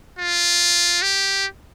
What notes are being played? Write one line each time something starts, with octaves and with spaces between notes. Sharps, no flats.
F4
G4